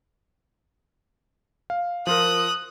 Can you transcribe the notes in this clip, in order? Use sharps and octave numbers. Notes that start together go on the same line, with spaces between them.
F5
F3 F4 A#4 D#6 F#6